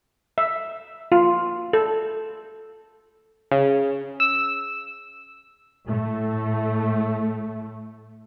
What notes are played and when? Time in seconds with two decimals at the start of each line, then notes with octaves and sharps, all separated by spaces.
0.38 E5
1.12 F4
1.73 A4
3.51 C#3
4.20 E6
5.86 A2 A3